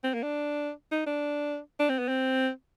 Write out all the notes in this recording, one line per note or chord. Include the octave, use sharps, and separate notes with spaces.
C4
A#3
D4
D#4
D4
D4
C4
B3
C4